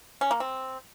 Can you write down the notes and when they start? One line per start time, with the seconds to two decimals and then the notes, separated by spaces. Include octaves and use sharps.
0.21 C#4
0.31 A#3
0.40 C4